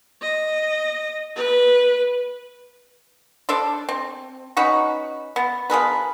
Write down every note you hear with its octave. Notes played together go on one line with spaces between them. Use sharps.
D#5
B4
D4 A4 C5 D5
C4
C#4 D#4 F#4 B4
B3
F3 G#4 A#4 B4